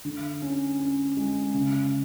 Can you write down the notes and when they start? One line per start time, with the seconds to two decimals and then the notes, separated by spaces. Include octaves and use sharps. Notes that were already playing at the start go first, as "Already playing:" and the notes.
0.05 D3
0.42 C#4
0.80 C#4
1.17 G#3
1.54 C#3